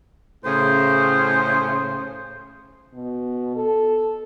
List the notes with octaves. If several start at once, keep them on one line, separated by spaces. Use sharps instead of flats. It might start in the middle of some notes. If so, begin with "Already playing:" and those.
A2 C#3 C5
B2
A4